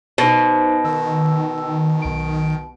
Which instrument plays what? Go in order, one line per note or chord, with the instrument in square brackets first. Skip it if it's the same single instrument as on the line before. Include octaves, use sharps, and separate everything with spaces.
[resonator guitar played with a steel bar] B2 [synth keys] D#4 C5
[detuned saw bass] D#3 [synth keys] E6
[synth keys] B1 D7